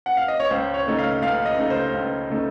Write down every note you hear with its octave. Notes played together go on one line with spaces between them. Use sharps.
F#5
F5
D#5
C#5
C#2 C5
C#5
C#3 A3 D#4
F5
C#2 F5
D#5
C#3 A3 D#4
C5
C#2
C#3 A3 D#4